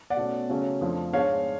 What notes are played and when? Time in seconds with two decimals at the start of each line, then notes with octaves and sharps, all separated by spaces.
0.10 D5 F#5
0.17 B2 A3 C#4
0.49 C#3 F#3 A3 C#4
0.81 F2 F3 A3 D4
1.13 G#2 G#3 D4 C#5 F5